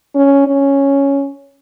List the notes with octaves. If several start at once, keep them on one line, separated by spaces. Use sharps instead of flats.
C#4
C#4